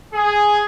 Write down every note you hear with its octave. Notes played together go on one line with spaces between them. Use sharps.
G#4